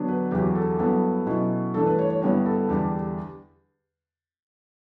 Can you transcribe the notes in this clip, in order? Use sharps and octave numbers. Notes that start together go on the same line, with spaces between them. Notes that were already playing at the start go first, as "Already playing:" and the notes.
Already playing: D3 F#3 B3 D4
B4
E2 D3 F#3 G4
A4
G2 F#3 B3 E4 A4
B2 F#3 C#4 E4
G2 E3 A3 D4 A4
B4
C#5
C#5
G2 D3 G3 B3 E4 C#5
A4
E2 D3 G3 D4 G4